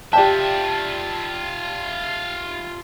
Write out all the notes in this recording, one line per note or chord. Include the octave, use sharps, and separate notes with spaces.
F4 G4 D5 E5 G5 A5